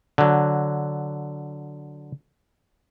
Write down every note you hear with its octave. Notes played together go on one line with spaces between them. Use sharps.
D3 F#3